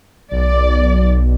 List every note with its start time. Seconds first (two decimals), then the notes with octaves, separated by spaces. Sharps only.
0.32 B1 D5